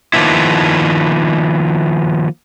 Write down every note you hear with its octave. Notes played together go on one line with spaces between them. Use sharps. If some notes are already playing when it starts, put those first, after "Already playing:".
D#3 F3 A#3 B3 E4